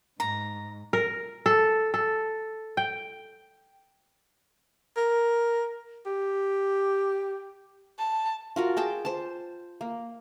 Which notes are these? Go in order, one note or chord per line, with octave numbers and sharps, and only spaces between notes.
G#2 A#5
A#4
A4
A4
G5
A#4
G4
A5
F4 F#4 A#4
G#4 G5 A5 D6
C5 A5
A#3